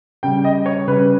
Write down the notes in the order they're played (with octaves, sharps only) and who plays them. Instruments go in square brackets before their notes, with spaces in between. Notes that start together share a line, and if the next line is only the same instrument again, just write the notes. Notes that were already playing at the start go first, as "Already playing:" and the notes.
[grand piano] C#3 G3 G5
D#5
C#5
C#3 G3 B4